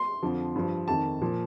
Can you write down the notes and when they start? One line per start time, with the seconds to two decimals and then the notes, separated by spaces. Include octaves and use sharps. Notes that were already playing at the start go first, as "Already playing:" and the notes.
Already playing: C6
0.23 F2 D3 F3
0.56 G2 F3
0.88 F2 D#3 A5
1.21 A#2 F3